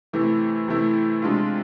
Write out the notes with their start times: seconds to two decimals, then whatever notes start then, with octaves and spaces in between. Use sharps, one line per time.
0.13 C3 E3 A3 E4
0.68 C3 E3 A3 E4
1.22 C3 G#3 D4 F4